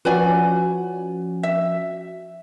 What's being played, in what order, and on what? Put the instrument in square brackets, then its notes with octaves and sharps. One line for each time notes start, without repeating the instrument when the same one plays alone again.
[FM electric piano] F3 C#4 F#4 [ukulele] B4 D5 G#5
[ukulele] E5